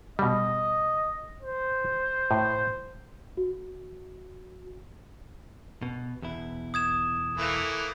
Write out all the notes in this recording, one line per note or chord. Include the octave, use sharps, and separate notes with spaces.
B2 G3 D#5
C5
A2
F#4
B2
E2 B2 E4
D#6 G#6 E7
E3 A3 A#3